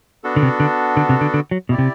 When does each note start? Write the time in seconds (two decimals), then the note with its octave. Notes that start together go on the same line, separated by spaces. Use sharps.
0.24 B3 D4 F#4 A4
0.36 D3
0.42 C3
0.60 D3
0.97 D3
1.09 C3
1.21 D3
1.34 D3
1.51 F#3
1.69 B2 E4 G4 D5
1.78 C3